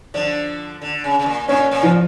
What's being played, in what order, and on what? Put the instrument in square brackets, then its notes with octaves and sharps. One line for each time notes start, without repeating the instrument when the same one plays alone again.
[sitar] D3 F3 [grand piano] D4
[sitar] D3
C#3
C#3
A#2
[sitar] A#2 [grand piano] C#4
[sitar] A#2
[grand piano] F3